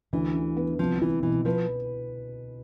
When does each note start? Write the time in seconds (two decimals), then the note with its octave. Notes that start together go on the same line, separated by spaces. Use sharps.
0.13 D2 E3
0.35 D3
0.57 B3
0.79 C2 F3
1.02 E3 E4
1.23 B2 E3
1.45 F3 B4